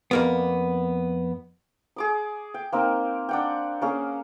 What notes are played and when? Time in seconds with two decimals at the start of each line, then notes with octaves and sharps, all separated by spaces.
0.11 F2 A#3 B3
1.96 G#4 D6 D#6
2.54 G5
2.72 A#3 C4 D#4 A#4
3.29 D4 F#5 G5
3.81 A#3 C#4 G#4